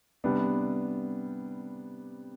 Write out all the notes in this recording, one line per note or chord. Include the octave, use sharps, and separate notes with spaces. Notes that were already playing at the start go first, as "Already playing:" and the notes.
C3 G3 B3 D4